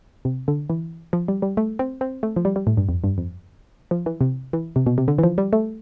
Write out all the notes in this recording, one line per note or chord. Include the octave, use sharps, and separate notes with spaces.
C3
D3
E3
F3
G3
G3
A3
C4
C4
A3
F3
G3
G3
A2
G2
F2
G2
F2
F3
E3
C3
E3
C3
B2
C3
D3
E3
F3
G3
A3